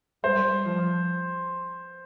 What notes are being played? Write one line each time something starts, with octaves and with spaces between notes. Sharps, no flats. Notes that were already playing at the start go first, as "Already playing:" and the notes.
G3 C5
F3